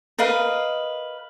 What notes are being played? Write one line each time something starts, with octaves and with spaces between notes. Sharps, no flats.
A#4 B4 D#5 F5